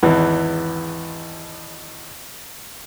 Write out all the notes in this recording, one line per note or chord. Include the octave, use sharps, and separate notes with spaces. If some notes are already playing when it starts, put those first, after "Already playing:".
G#1 E2 E3